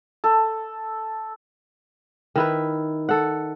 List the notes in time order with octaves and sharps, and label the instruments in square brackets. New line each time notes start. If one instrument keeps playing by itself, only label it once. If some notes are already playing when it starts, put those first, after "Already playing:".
[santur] A4
[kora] D#3 E4 B4
A4 F#5